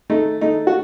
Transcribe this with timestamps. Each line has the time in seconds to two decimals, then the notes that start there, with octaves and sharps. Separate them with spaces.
0.10 A3 D#4
0.41 A3 D#4
0.67 F#4